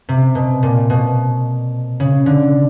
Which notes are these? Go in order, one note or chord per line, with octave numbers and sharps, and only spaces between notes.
C3
B2
A#2
B2
C#3
D3